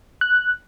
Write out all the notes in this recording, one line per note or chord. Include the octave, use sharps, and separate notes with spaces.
F#6